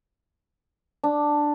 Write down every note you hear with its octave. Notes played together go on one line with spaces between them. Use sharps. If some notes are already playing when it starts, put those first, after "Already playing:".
D4